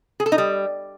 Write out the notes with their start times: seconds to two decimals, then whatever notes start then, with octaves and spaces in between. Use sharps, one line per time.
0.20 G#4
0.26 A4
0.32 D#4
0.38 G3